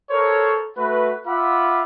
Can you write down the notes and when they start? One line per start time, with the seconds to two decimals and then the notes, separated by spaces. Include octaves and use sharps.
0.11 A4 A#4 C5 C#5
0.77 A3 F#4 B4
1.27 F4 E5 F#5 B5 D6